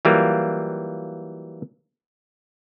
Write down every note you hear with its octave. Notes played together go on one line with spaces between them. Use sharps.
E3 F#3 G3 A#3 F4